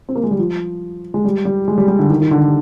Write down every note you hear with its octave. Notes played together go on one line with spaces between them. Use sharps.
C4
A#3
G#3
G3
F3
G#3
G3
G3
G#3
G3
G3
D3
D#3
D#3
D3